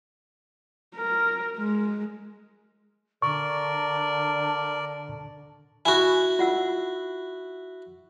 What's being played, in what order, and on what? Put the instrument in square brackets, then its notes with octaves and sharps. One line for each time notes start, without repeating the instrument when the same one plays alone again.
[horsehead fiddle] A#4
G#3
[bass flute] D3 [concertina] A#4 D5 [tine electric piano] C#6
[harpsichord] E4 F#4 [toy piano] G#5 B5
[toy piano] F4 F#5 E6